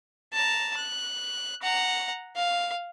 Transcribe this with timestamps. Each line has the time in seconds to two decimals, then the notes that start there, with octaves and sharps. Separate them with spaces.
0.34 A5 A#5
0.77 F#6
1.62 F#5 A#5
2.36 F5